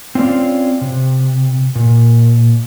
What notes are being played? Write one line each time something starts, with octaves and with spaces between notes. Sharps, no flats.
C4 C#4 F4 D5 F5
C3
A#2